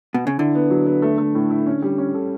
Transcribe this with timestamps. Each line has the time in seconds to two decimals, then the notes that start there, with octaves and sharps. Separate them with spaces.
0.14 B2
0.27 C#3
0.39 D3 E4
0.55 B3
0.70 F#3
0.86 B3
1.02 A3
1.18 A3
1.35 A2
1.50 E4
1.66 C#4
1.82 G3
1.98 C#4
2.14 A4